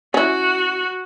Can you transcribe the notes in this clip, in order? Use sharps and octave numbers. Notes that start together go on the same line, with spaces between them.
C#4 E4 F#4